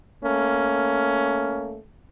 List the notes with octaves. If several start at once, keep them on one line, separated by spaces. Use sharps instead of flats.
A3 A#3 C#4